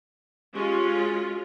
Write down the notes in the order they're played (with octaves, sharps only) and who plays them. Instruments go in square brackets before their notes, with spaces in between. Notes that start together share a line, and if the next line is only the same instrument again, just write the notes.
[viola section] G#3 C#4 F4 [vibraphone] G4 C#6
[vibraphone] F#4